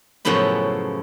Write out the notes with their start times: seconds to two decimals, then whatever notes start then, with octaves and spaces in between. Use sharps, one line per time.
0.25 F#2 A2 C#3 F3 B3 E4